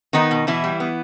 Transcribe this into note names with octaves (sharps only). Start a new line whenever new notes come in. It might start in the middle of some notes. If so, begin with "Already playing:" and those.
D#3 B3 D#4
B2
B2 E3 E4
G3
B3